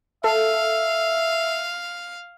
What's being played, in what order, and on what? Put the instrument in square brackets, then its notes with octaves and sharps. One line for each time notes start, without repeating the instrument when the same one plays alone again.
[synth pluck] A4 [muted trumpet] E5 [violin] F5